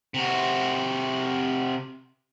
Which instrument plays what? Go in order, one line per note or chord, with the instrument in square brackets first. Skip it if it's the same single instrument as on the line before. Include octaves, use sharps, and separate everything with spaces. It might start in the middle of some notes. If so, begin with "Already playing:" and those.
[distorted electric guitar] C3 F#4